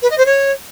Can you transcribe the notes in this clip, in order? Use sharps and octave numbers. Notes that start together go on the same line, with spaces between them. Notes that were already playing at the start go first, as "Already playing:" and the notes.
B4
D#5
C5
C#5